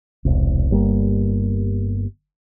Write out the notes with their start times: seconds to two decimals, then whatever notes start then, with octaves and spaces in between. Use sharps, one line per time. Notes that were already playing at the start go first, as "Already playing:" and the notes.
0.25 E1 C2
0.71 G1 G3 A#3